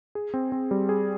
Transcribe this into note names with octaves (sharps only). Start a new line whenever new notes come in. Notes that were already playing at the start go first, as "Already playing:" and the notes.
G#4
C4
C4
G3
G#4